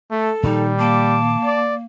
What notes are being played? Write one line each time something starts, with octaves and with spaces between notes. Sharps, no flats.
A3 A4
A#2 D#3 F3 G3 D#4
A#3 A5 D6
D5